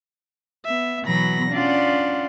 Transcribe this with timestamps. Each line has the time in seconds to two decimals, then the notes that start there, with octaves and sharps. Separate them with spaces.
0.66 B3 E5
1.03 B2 E3 F#3 B3 B5 A#6
1.50 C#4 D4 F4 D5 F#5